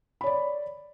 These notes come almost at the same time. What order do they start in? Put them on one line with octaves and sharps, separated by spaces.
B5 C#5 D5